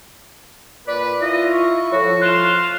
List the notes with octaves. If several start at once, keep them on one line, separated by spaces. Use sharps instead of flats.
A#2 B4 D5
E4 F4 D#5
C#6
F3 F#4 A4 C#5
F4 F#6 E7